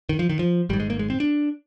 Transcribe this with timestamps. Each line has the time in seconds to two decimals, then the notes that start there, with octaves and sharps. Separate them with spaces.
0.09 D#3
0.19 F3
0.29 D#3
0.39 F3
0.69 G#1 G3
0.73 G#2
0.80 G#3
0.90 A#3
0.99 G#3
1.10 C4
1.20 D4